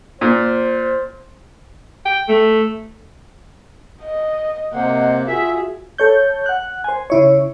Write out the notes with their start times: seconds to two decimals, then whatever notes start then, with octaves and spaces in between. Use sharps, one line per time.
0.21 A#2 C5
2.05 G5
2.28 A3
4.02 D#5
4.73 C3 A#3 C5 D#5 F#5
5.27 F4 F#4 G#4 E5
5.98 A4 C#5 G6
6.46 F#5 F#6
6.84 C5 G#5
7.10 C#3 E4 C#5